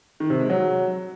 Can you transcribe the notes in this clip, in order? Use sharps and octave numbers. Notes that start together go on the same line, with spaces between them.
D#3
C3
G#3
F#3